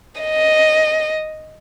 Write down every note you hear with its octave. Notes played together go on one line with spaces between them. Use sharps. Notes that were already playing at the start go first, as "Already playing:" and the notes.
D#5